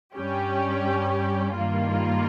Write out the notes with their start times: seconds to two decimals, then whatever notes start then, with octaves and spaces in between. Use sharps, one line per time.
0.15 G2 G3 C#4 G4
1.55 G2 D#3 G3 A#3 F4